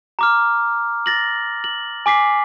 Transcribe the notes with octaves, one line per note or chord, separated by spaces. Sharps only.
A#5 D6 F6
A6 A#6 F#7
F#7
G#5 D6 B6 C7